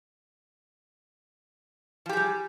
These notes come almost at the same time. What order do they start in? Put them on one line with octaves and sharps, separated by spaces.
F3 G4 G#4 G3